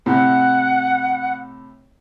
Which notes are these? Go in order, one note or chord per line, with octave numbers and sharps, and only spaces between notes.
A2 C3 F#5